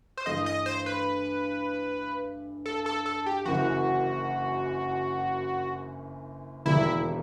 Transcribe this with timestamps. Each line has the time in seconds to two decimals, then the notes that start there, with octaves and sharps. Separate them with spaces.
0.17 C5
0.26 G2 E3 A3 D#5
0.46 D#5
0.66 C5
0.86 B4
2.66 A4
2.86 A4
3.06 A4
3.26 G4
3.45 F#1 F#2 E3 F#4
6.66 E1 D#2 D#3 G3 E4